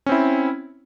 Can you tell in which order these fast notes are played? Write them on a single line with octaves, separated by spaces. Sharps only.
C#4 C4 E4